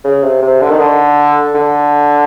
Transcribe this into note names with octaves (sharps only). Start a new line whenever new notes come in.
C#3
C3
C3
D3
D#3
D3
D3